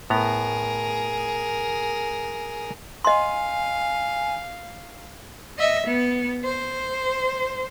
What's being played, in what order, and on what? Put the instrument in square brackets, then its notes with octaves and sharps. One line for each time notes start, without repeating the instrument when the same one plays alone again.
[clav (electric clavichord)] A2 B3 A#5 [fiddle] G#4 A#4
[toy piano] D#5 C6 [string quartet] F5 [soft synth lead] G#5
[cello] D#5 E5
B3
C5